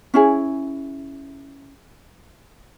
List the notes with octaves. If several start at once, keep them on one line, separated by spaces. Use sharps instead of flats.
C#4 E4 G#4